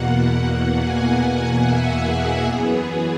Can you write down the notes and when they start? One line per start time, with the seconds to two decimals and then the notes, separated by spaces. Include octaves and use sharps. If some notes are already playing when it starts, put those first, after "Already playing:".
Already playing: E2 B2 A#3 F#5
0.79 G#5
1.62 E5
2.04 G#4
2.45 F#2 E3 B3